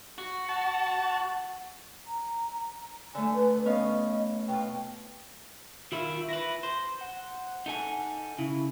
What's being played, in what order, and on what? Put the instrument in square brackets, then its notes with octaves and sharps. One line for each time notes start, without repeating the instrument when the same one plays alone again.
[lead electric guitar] F#4
[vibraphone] F#5 [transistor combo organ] A5
[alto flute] A#5
[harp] D3 A3 [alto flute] G#5
[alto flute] B4
[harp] B3 C#4 F5 [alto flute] D#5
[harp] B2 F4 [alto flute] G5
[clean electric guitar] D#3 E4 [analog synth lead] F4
[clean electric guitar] E4 B4 [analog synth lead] A#6
[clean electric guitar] C5
[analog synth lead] F#5
[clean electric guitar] D#4 A4 G#5
[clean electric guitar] C#3 [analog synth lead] E4